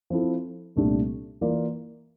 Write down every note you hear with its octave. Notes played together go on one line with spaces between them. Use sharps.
F3 C4 E4 A4
C2 A#2 A3 D4 G4
E3 A#3 F4 A#4 D5